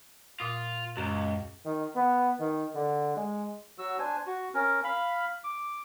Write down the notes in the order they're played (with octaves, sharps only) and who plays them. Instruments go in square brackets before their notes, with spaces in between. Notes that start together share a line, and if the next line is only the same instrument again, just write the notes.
[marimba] A#2 D#6 [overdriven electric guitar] F4
[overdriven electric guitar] C#2 [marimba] F#2 A#5
[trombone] D#3
B3
D#3
D3
G#3
[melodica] F#3 F#4 E6
D4 C5 G#5
F#4
C#4 A#4
F5 B5
D6